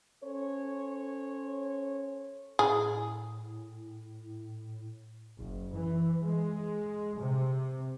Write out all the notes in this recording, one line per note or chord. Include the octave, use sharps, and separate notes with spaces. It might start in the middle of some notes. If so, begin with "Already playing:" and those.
C#4 A4 C5 C#5
A2 G#4
F#1
E3
G#3
C3